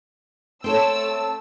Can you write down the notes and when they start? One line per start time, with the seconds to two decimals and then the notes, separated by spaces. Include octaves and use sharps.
0.64 A3 C4 A4 C#5 A5 E6